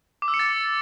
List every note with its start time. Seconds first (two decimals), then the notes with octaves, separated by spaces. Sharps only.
0.22 D6
0.28 E6
0.34 C#7
0.39 A6